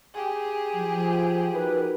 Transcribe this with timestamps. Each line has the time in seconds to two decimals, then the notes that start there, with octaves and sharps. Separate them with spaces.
0.14 G4 G#4
0.75 F3
1.54 D#4 F#4 A#4 B4